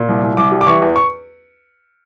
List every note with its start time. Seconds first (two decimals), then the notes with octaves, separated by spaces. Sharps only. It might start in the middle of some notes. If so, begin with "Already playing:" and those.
Already playing: A#2
0.08 C2
0.23 C2
0.37 C2 D6
0.52 G3
0.61 D6
0.67 E3 C#6
0.82 E2
0.96 C#6